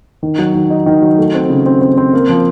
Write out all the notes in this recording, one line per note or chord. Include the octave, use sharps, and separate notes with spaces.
D#3
F#3
D#3
D#4
D#3
F#3
A3
C4
C#3
C4
C4
C4
A#3
F3